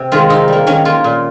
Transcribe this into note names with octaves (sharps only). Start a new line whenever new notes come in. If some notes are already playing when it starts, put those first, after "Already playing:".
Already playing: C3
D#3 G#3 F4
C3 D#4
G3 A#3
D#3 C#4
A#3 F4
A#2